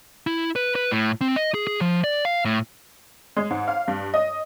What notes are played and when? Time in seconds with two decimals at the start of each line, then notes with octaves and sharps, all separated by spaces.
0.27 E4
0.56 B4
0.76 B4
0.92 A2
1.21 C4
1.36 D#5
1.54 G#4
1.67 G#4
1.81 F3
2.04 D5
2.25 F5
2.45 A2
3.37 G#3
3.50 G#2
3.68 F5
3.88 G2
4.14 D#5